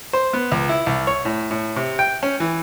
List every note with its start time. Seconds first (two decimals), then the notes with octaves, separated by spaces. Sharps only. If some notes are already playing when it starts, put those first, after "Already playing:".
0.13 C5
0.33 B3
0.52 C#2
0.69 E4
0.86 C2
1.07 C#5
1.25 A2
1.51 A2
1.76 C3
1.99 G5
2.23 C#4
2.40 E3